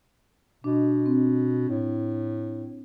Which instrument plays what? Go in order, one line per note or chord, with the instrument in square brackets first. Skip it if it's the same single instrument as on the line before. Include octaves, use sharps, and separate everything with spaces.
[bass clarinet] B2 [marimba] D4 D#5
[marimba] C4
[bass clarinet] A2